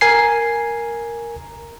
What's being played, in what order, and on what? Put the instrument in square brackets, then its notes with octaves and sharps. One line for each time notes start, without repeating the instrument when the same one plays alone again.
[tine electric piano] A#4 G#5 C7